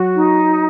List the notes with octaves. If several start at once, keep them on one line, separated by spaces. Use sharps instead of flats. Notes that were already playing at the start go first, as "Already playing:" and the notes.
Already playing: F#3 F#4
D#4